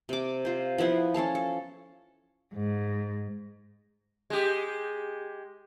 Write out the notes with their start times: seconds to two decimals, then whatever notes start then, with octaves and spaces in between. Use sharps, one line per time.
0.09 C3 D6
0.45 F4 C5
0.78 F3 B3 E4 F#5
1.14 C#4 A4 F5 A5
1.35 A4
2.54 G#2
4.30 G#3 G4